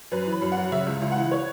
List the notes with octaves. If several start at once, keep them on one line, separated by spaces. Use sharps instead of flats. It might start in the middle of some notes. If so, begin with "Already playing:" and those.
F#2 B4
E3
B5
F#2
F#2 F#5
C#3 E5
C#2
C#2
F#5
E3
C#5